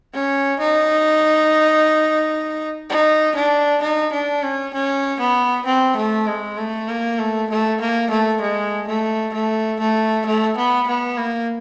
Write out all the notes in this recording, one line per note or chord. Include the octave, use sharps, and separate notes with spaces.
C#4
D#4
D#4
D4
D#4
D4
C#4
C#4
B3
C4
A3
G#3
A3
A#3
A3
A3
A#3
A3
G#3
A3
A3
A3
A3
B3
B3
A#3